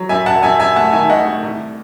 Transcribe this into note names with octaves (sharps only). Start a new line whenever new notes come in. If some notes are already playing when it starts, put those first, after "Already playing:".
Already playing: F#3
F#2 E5 G#5
F#2 F#5 A5
F#2 E5 G#5
F#2 E5 G#5
A3 F#5 A5
D#3 E5 G#5
A3 D#5 F#5
A3
C2